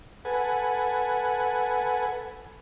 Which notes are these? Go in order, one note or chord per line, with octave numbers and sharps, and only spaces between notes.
A4 B4 F#5 G#5